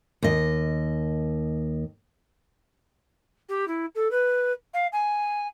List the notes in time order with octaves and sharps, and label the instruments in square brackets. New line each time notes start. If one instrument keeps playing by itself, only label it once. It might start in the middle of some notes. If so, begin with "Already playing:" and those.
[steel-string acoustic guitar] D#2 D#5
[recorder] G4
E4
A4
B4
F5
G#5